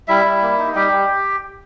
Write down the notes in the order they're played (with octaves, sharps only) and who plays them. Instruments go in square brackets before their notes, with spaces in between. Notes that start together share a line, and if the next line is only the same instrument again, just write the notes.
[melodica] G3 E4 E5
G3
A#3
D#4
G3 G4 G5
G3